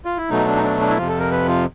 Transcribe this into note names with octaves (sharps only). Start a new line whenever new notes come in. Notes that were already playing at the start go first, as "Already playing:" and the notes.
F4
E4
B2 F#3 A3 D#4
D4
D#4
D4
D4
E4
F2 C3 F3 F4
A4
A#4
B4
F4